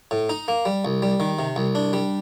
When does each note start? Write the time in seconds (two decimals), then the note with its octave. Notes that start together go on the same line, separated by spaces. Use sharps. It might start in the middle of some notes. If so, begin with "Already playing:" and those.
0.11 A2
0.29 D#4
0.48 A#3
0.65 G3
0.85 C2
1.02 G3
1.20 D#3
1.39 C3
1.56 C2
1.75 D4
1.93 G3